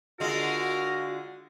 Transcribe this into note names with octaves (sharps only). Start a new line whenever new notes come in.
D3 G#3 F4 F#4 A#4